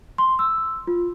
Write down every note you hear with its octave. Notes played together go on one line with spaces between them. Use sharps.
C6
E6
F4